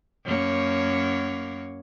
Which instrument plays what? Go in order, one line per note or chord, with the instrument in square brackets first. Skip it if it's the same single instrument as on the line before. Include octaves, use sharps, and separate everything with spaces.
[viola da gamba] F#2 A#3 C#5